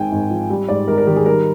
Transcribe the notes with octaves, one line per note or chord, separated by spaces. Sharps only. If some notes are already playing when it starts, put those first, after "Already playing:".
Already playing: G#1 G#2 G5 G#5
G#1
F3
G3
G#2 D5
G#1 A#4
A#4
D#3 G4
G#4
G3 A#4